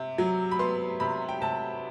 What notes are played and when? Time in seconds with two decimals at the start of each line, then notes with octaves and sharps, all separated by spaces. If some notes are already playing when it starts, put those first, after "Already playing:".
Already playing: C3
0.18 F#3
0.51 B5
0.59 B3 C6
1.00 C3 B5
1.29 G5
1.41 C3 A5